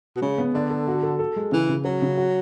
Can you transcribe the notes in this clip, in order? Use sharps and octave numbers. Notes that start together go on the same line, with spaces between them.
B2
C#3 G#3
B3
D3 D5
A4
F#4
A4
A4
G#3
C#3 E3
C#3
F#3 C#4
C#3
F#4